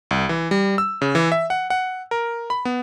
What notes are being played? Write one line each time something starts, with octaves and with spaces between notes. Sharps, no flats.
C2
E3
G3
E6
C#3
E3
E5
F#5
F#5
A#4
B5
B3